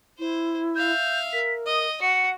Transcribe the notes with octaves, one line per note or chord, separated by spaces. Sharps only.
E4 C5
E5 F5 G6
A#4 B6
D#5 D#6
F#4 F#5 C#7